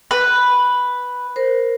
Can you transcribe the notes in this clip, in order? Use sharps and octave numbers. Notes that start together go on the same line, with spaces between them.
B4
A#4 C5